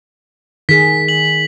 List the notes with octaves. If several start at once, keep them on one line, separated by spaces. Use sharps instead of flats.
D#3 G#4 B6
F#7